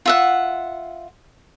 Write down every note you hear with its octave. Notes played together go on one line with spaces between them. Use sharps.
F4 E5 F#5